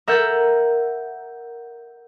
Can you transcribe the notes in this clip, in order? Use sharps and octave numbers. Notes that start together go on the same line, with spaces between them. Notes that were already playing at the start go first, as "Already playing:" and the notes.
A#4 E5 F#5 E6 G6 A6